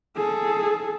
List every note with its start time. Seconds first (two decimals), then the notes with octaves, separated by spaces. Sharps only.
0.17 G#4 A4